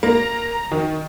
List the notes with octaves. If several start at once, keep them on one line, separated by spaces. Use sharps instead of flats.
A#3 A#5
D#3